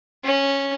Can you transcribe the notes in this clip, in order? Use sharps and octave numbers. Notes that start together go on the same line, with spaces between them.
C#4